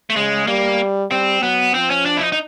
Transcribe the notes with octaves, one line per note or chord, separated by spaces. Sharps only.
A3
C#3 G#3
G3 A#3
G3 C4
F#3 B3
F3 C4
C#4
D4
E4
D#4
D#4